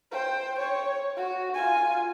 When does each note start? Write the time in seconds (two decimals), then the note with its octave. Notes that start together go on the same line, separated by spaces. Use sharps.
0.11 C5 G5
0.59 C#5
1.17 F#4
1.55 F4 G#5